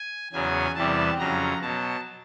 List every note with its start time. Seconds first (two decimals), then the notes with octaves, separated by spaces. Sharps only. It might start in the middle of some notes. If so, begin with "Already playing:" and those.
Already playing: G#5
0.33 E2 C#3 F#3 G#5
0.75 E2 C3 E3 G3 A5
1.19 F2 C#3 F#3 A#5
1.61 B2 F#3 A5